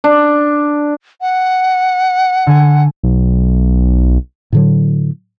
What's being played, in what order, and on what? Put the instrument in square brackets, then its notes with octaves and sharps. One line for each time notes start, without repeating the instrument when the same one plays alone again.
[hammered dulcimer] D4
[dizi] F#5
[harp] D3 G#5
[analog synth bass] B1
[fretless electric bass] A2 D3 F#3